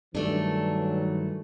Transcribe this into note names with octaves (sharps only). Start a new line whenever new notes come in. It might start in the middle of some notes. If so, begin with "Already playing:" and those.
G2 D#3 E3 F#3 A3 D4